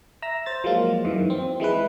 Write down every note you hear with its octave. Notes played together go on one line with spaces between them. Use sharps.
E5 A#5 E6
C5 A6
F3 F#3 G#3 A#3 F4
F#2 D#3 E3
C4
E3 G#3 E4 B4